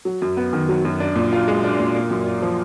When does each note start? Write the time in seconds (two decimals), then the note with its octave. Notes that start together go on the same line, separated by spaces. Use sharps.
0.05 F#3
0.22 F#2
0.37 B3
0.53 D#3
0.69 F#3
0.85 F#2
1.00 D4
1.16 A#2
1.32 F4
1.48 G#3
1.64 D4
1.79 A#2
1.95 A#3
2.11 F#2
2.26 F4
2.42 F3